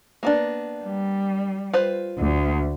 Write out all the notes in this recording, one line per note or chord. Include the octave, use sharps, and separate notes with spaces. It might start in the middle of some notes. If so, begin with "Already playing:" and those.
A#3 B3 D4
G3
F4 B4 C5
D2